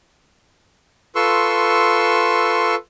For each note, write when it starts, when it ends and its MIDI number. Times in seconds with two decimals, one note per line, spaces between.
1.15 2.75 65
1.15 2.75 69
1.15 2.75 71
1.15 2.75 84
1.15 2.75 85
1.15 2.75 88